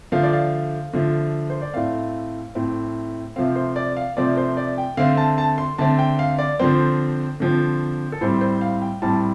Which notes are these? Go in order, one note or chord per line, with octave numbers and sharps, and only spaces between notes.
D3 F3 A3 F5
D5
F5
D3 F3 A3
C5
D5
A2 A3 C4 F5
A2 A3 C4
C3 F3 A3 C4 F5
C5
D5
F5
C3 F3 A3 C4 D5
C5
D5
G5
D3 A3 C4 F5
A5
A5
C6
D3 A3 C4 A5
G5
F5
D5
D3 F3 C4 C5
D3 F3 C4
A4
A2 G3 C4 C5
C5
F5
G5
A2 G3 C4 A5